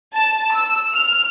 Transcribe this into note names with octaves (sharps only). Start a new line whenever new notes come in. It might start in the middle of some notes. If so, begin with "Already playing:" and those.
A5
E6
F6